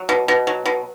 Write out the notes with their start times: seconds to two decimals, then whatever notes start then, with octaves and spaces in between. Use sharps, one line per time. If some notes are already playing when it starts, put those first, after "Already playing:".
Already playing: F#3
0.09 B2
0.28 B2
0.47 F#3
0.66 B2